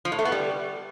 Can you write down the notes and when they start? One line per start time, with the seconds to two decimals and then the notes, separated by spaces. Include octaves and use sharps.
0.05 F3
0.12 A2
0.19 A3
0.25 B3
0.32 G3